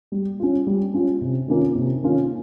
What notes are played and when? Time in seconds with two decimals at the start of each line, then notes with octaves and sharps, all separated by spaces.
0.12 G3
0.40 C#4 F4
0.67 G3
0.94 C#4 F4
1.21 C3
1.48 D#3 A#3 C#4 F4
1.75 C3
2.02 D#3 A#3 C#4 F4